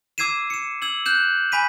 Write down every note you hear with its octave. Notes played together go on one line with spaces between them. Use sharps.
D6 E6 G#6 C7 D#7 E7
C#7 E7
E6 G#6 F#7
F#6 G6 E7
G#5 B5 B6 D#7